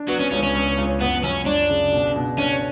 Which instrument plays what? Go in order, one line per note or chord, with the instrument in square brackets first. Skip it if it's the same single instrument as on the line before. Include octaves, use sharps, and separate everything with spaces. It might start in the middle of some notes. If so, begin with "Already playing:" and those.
Already playing: [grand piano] D4
[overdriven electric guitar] F#3 [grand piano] B3
[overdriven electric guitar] C#4
[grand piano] C#2 [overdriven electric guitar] C#4
[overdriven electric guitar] C#4
[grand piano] C#2
C#2
[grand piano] F#2 [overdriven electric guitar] B3
[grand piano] F#2 [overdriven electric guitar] C#4
[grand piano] F#2 [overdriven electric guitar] D4
[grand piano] C#3
B2
B2
[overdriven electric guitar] C#4 [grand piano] D4